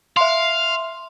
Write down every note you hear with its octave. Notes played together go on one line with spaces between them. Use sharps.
E5 F5 C6